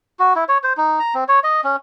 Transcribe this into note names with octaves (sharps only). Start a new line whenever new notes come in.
F#4
E4
C#5
C5
D#4
A#5
C4
C#5
D#5
C#4